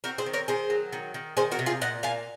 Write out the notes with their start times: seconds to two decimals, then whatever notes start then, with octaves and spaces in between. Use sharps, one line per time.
0.04 C4 F#4 A#4
0.18 G#4 C5
0.26 D#3
0.33 A#4 C#5
0.48 D#3 G#4 C5
0.70 F#3
0.93 D#3
1.14 D#3
1.37 D#3 G#4 C5
1.51 F#4 A#4
1.59 C3
1.66 F4 G#4
1.81 A#2 D#5 F#5
2.03 A#2 F5 G#5